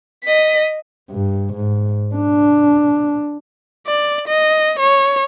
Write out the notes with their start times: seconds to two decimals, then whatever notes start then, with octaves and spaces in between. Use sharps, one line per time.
0.24 D#5 B6
1.11 G2
1.54 G#2
2.15 D4
3.87 D5
4.28 D#5
4.79 C#5